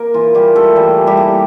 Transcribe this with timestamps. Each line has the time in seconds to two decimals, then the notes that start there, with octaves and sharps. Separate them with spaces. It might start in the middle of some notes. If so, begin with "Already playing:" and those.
Already playing: A#3 A#4
0.14 E3 F4
0.35 G3 A#3 G4
0.55 A3 E4 A4
0.76 E3 G3 G4
0.97 E3
1.07 G3 G4
1.17 A#3